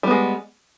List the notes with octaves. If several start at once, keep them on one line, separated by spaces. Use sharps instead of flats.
G3 G#3 B3